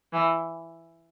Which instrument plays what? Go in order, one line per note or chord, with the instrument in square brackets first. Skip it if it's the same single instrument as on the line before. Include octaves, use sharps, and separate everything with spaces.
[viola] E3